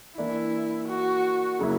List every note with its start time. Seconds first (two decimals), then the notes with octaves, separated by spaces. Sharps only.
0.17 E3 A#3 D4 E4
0.88 F#4
1.59 C#3 F#3 A#3 E4